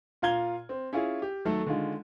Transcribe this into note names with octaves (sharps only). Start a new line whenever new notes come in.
A#2 F4 F5 A#5 G#6 G7
C4
C#4 E4 F4 G#4
G4
D#3 F#3 A3 A4
D3 D#3 G#3 F4